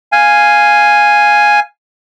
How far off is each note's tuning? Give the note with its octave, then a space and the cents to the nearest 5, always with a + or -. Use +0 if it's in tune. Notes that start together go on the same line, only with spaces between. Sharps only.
F5 +0 G#5 +0